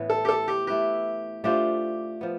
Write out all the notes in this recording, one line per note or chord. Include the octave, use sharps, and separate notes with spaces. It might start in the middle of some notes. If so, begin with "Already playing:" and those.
Already playing: A2 E3 B3
A4
G4
A4
G4
A3 E4 G4 B4
A3 D4 F4 G4 C5
F3 B3